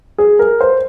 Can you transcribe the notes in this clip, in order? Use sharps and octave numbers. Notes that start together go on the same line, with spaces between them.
G#4
A#4
C5